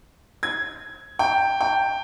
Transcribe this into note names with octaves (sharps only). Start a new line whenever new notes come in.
G#6
G5
G5